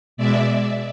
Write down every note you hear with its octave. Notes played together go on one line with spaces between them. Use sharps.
B2 G#3 D5 E5